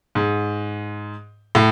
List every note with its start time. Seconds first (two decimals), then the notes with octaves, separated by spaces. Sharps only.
0.15 G#2
1.55 A2